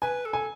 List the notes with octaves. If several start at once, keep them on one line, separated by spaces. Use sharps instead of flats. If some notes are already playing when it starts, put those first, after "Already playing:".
B4 G#5
A4
G#5